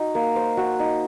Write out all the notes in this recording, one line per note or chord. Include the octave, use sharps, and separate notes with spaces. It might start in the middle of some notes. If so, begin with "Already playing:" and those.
Already playing: D#4 F#4
A#3
C5
F#4
D#4